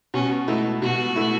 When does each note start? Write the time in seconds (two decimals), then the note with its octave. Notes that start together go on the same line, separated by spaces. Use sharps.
0.14 B2 C#4
0.48 A3 D#4 E4
0.82 B2 F#4
1.16 A3 E4